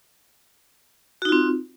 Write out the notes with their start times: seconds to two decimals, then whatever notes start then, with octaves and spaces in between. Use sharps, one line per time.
1.22 F#4
1.25 D#4
1.29 F4
1.32 C4